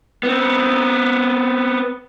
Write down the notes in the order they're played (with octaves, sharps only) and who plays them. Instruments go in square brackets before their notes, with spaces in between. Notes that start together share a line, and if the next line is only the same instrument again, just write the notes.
[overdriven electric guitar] B3 C4